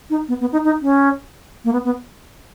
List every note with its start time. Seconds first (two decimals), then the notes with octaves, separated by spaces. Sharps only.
0.10 D#4
0.28 B3
0.40 B3
0.52 D#4
0.64 D#4
0.82 C#4
1.65 A#3
1.73 B3
1.85 B3